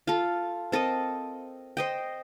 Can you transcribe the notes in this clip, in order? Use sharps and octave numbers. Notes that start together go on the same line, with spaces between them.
F4 A4
C4 A4 A#4 D#5
C5 D#5 G5